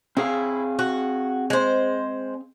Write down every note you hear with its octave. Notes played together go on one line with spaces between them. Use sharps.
C4 E4 G#4 F5
F#4
G#3 C5